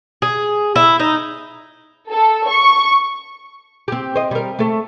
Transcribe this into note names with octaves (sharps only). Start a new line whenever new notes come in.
G#4
E4
D#4
A4
C#6
C4 G4
C5 D#5
G3 A#4
A3 A4